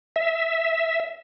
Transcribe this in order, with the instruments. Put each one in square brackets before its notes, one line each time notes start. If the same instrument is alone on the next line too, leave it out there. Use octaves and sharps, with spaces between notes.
[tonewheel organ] E5